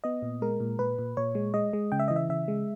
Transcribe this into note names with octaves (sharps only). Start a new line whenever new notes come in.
B3 D#5
A#2
G#3 A#4
A#2
A#2 B4
A#2
A#2 C#5
G#3
G#3 D#5
G#3
C#3 G5
E5
E3 D#5
E5
C#3 E5
G#3